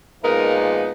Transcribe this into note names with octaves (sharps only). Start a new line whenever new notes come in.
A#2 F3 G#3 B3 D#4 A#4